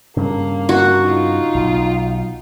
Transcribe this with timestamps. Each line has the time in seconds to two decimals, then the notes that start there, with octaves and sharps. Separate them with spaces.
0.17 G2 C#3 A#3
0.69 F#4
1.03 D#4 F4
1.55 B1